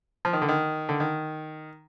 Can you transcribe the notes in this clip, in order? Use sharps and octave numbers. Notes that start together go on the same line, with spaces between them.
F3
D#3
D3
D#3
D3
D#3